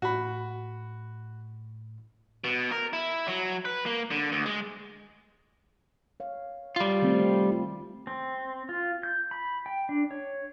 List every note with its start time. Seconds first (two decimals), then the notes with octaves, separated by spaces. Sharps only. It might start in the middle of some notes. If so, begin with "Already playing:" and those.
0.02 A2 F#4 B5
2.44 B2
2.72 A#4
2.93 E4
3.28 F#3
3.65 B4
3.86 A#3
4.11 D3
4.32 D2
4.46 G#3
6.20 C#5 F5
6.76 G3 F4
7.02 D#3 A3 C4
7.52 F4
8.07 C4
8.69 F4
9.03 G6
9.31 B5
9.66 G5
9.89 D4
10.11 C#5